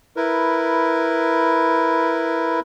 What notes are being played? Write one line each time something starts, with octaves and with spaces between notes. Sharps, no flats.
E4 A#4 B4